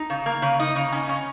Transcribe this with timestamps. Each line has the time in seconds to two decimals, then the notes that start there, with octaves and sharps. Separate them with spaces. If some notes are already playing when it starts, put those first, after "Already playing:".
Already playing: D#4
0.10 C#3
0.26 A#3
0.42 C#3
0.59 D#4 D#5
0.76 C#3
0.92 C#4
1.09 C#4